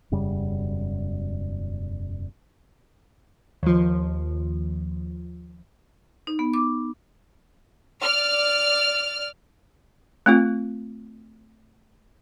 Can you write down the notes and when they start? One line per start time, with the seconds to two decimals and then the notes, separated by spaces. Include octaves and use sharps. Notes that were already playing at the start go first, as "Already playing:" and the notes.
0.11 E1 F#2 C#3 G3
3.63 D#2 F3
6.27 D#4
6.39 B3
6.54 D6
8.02 D5 F6
10.26 A3 C4 F4